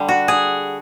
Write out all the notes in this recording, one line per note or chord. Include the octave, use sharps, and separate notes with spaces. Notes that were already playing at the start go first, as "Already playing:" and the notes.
Already playing: D3 G3
F#4
G#4